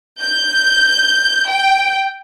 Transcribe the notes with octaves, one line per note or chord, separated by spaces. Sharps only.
G6
G5